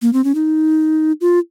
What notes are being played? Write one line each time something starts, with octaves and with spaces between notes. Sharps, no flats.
A#3
C4
C#4
D#4
F4